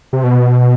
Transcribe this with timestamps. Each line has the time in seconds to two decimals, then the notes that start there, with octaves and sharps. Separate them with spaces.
0.13 C3
0.24 B2